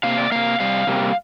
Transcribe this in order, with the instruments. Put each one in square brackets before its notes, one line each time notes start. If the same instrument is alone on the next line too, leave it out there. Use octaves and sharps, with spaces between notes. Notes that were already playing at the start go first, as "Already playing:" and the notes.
[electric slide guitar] C3 A#3 F5
D5
C3 A#3 F5
C3 G3 F5
C3 G3 A#3